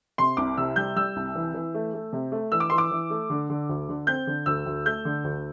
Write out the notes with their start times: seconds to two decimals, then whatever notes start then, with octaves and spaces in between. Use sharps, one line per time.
0.18 C3 C6
0.37 C2 D6
0.57 C3 E6
0.76 G3 G6
0.96 G3 E6
1.16 C2
1.35 E3
1.54 E3
1.75 A3
1.94 A3
2.13 C3
2.32 A3
2.52 E3 E6
2.60 D6
2.70 E3 C6
2.78 D6
2.91 E3
3.10 A3
3.30 D3
3.50 D3
3.69 D2
3.89 D3
4.07 C4 G6
4.27 D3
4.46 D2 E6
4.66 D2
4.86 A3 G6
5.05 D3
5.24 D2